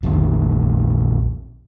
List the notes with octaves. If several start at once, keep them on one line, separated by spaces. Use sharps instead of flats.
A#1 F2 A#2 D#3